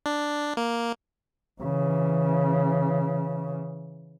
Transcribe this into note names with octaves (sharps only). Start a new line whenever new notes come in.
D4
A#3
C#3 E3